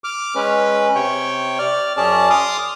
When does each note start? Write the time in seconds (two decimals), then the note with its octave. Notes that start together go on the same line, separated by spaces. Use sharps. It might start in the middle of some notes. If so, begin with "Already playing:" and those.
0.04 D6 F6
0.35 G#3 C#4 B4
0.95 C3 C#5 G5
1.59 D5 F6
1.97 F#2 C#4 G#4 D5 A5
2.30 C6 D6 D#6 F6